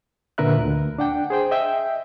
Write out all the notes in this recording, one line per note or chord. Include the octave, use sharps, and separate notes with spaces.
A#2 D3 A#4 B4 E5 F#6
D2
D4 F#5 G5
G#4 C5 G5
D#5 E5 G5